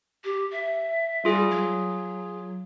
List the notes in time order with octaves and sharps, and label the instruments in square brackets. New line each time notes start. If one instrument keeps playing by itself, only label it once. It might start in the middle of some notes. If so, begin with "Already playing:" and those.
[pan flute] G4
E5
[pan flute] G3 [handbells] F4 G#4
[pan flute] F#3